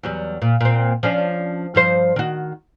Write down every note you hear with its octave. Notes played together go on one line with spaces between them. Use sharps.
E2 F#3 G3
A#2
A#2 C4
F3 C#4 D4
G2 F3 C5
D#3 F#4